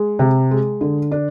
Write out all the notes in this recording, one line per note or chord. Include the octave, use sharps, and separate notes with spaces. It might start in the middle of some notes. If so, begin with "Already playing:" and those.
Already playing: G#3
C3
G#3
D3
D4